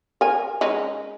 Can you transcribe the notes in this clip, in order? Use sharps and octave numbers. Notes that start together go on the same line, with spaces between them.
A#4 G#5
G#3 C#4 D#4